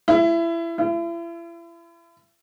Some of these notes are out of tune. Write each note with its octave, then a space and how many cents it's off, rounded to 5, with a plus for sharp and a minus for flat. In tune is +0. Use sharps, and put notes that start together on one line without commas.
E4 +25
E4 +40